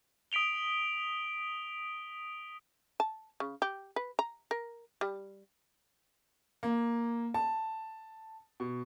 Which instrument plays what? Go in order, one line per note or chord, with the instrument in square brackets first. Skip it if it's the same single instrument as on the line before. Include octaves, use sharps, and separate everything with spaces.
[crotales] D#6 B6 D7 F7 G7
[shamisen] A5
C#3
G4
B4
A#5
A#4
G3
[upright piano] A#3
A5
B2